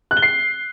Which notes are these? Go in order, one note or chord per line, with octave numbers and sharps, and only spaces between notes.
F#6
G7
C7